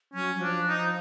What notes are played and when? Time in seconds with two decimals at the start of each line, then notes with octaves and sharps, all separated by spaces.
0.14 F#3 C#4
0.35 F#3
0.41 F3 D4
0.69 D#4